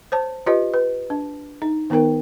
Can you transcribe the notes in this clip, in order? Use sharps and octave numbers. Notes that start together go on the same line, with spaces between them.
C5 C#5 A5
F4 G4 B4 C#5 D#5
B4
D4
D#4
D#3 B3 D#4 A#4 G5